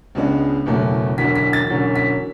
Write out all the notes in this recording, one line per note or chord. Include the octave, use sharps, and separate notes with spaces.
C#2 C#3 G#3 B3 D4
F#1 E2 B2 F#3 A3
E1 E2 D3 F#3 B6
B6
A6
E1 E2 D3 F#3 C#4
B6